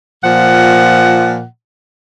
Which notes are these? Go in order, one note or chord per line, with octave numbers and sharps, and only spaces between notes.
A#2 F3 F#5